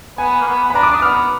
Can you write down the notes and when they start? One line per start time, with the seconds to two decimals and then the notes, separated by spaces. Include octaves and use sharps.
0.18 B3 G#5
0.41 A#3
0.47 B3
0.65 B3
0.70 B5
0.74 D4 A#5
0.83 D6
0.91 D4 D#6
1.02 B3 F6